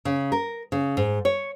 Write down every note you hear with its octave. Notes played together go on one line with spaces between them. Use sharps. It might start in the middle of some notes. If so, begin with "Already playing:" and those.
C#3
A#4
C#3
G#2
C#5